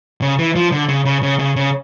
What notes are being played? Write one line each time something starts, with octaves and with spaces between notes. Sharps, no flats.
C#3
E3
F3
D3
C#3
C#3
C#3
C#3
C#3